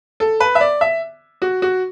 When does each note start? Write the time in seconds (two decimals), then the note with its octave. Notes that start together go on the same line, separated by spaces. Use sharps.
0.20 A4
0.40 B4
0.55 E5
0.61 D5
0.81 E5
1.42 F#4
1.62 F#4